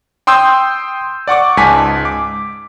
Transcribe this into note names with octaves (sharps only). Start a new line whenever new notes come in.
G5 C6 D#6 E6 G6
D5 F#5 C#6 D6
C#2 G#2 G#5 A5 B6
D6